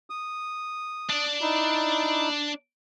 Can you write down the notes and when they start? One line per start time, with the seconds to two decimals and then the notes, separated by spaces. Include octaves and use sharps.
0.10 D#6
1.10 D4 D5
1.41 D#4 E4